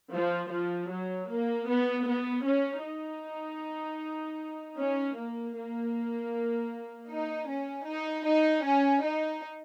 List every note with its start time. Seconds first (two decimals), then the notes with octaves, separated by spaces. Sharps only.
0.13 F3
0.52 F3
0.90 F#3
1.29 A#3
1.68 B3
2.07 B3
2.45 C#4
2.84 D#4
4.78 C#4
5.17 A#3
5.55 A#3
7.10 D#4
7.48 C#4
7.87 D#4
8.26 D#4
8.65 C#4
9.04 D#4